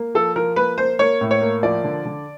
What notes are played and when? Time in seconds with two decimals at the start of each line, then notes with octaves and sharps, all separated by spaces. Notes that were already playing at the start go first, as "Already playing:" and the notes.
Already playing: A#3
0.15 F3 A4
0.36 F3 A#4
0.56 A#3 B4
0.78 A#3 C5
0.99 A#3 C#5
1.21 A2
1.31 C#5
1.41 A#3
1.63 F3 D5
1.84 D3
2.06 D3